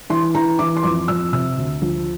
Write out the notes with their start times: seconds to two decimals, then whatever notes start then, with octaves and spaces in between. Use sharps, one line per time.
0.10 E3 C6
0.35 E3 A#5
0.59 E3 D6
0.77 C6
0.83 F2 D6
1.08 F2 E6
1.33 C3 E6
1.57 D2
1.82 F3